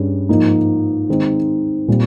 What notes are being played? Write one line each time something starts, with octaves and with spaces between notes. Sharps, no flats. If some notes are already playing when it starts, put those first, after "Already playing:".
Already playing: G2 G3 C#4 G#4
G#2 F3 A#3 D#4
D#3 G#3 C4 D#4
A#2 G3 C4 G4